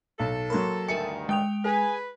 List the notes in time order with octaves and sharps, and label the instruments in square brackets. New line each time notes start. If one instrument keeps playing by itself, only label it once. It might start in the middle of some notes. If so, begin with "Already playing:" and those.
[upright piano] B1 [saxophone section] A4
[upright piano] F#3 A#3 [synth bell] B5 C6
[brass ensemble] D2 G2 D#3 [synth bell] A#4 E5 G#5 [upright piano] C#7
[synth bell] G#3 D#6 F7 [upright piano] G5
[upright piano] G#4 [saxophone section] B4 [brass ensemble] G#5